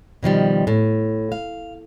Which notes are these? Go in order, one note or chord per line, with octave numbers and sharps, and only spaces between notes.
B2 D#3 F3 G3
A2
F5